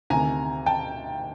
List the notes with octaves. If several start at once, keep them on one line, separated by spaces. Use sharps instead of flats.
D2 C3 D#3 G#5 A#5
G5 A5